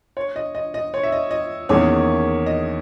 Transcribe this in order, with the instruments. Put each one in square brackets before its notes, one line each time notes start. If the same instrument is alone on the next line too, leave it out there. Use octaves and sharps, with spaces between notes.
[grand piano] C#5
D#5
D#5
D#5
C#5
E5
D#5
D#5
[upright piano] E2 D#3 A#3 C#4 G#4 [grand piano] C#5
[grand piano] D#5